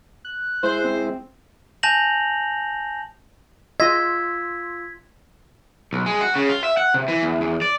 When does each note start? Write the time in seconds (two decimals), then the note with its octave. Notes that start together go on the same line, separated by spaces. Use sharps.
0.25 F#6
0.63 G#3 E4 C5
0.85 C4
1.83 G#5 A5 G6 A#6 F7 F#7
3.80 F4 D#5 C6 E6 G#6 B6
5.93 B1
6.06 G#3
6.21 F#4
6.36 C#3
6.49 F4
6.64 E5
6.77 F#5
6.94 C3
7.08 E3
7.23 E2
7.41 E2
7.62 D5